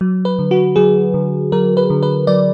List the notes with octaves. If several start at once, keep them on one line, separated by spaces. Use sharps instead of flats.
F#3
B4
D3
F#4
F#3 G#4
D3
F#3 A#4
B4
D3
B4
F#3 D5